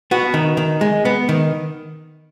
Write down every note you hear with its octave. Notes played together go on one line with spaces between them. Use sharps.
B3 F#4
D#3
D#3
G#3
B3
D#3